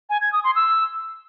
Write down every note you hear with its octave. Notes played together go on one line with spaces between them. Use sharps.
G#5
G#6
D#6
C6
E6